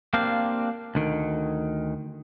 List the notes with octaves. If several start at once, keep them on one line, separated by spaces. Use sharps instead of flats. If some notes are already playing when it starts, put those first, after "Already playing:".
A#3 C4 D4 G4 F5
D2 D#3